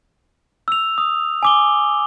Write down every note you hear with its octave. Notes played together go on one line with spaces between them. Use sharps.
E6 F7
D#6
G#5 D6 G7